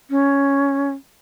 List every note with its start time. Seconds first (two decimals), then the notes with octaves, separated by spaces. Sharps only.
0.10 C#4